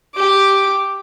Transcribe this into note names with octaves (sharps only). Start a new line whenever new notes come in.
G4 D6